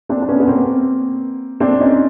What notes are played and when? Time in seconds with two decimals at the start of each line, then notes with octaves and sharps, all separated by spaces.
0.09 C4 D4
0.22 D4
0.28 B3 C#4
0.40 B3
0.48 A#3 C4
1.60 C4 D4
1.80 C#4 D#4